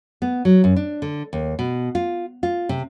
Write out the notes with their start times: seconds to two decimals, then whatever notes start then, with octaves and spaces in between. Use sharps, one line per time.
0.22 B3
0.45 F#3
0.64 F#2
0.76 D4
1.02 D3
1.33 D#2
1.59 B2
1.95 F4
2.43 F4
2.69 C3